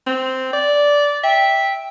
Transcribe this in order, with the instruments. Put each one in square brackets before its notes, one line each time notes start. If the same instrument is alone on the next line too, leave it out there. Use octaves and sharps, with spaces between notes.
[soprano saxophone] C4
D5
[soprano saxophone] E5 [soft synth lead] G5